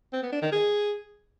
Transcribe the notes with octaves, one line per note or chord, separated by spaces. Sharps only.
C4
B3
D4
D#3
G#4